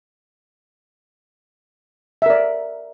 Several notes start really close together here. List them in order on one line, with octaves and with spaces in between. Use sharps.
E5 A#4 D5